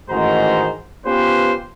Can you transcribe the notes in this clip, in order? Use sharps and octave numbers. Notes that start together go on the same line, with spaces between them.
A1 G#2 D#3 F#4 C5 A#5
B3 C#4 F4 G4 B4 C5